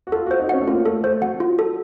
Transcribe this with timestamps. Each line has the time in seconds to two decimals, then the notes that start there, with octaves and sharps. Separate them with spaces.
0.07 F#4
0.12 F4 A4
0.26 F#4 C5
0.39 D#4
0.49 C#4 F#5
0.61 A3
0.67 A#3 F4
0.85 A3 A4
1.03 A3 C5
1.22 F#3 F#5
1.40 F4
1.59 A4